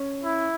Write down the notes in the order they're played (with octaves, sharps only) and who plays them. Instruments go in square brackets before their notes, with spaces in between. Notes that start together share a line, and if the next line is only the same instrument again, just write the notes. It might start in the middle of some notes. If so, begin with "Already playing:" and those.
Already playing: [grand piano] C#4
[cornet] E4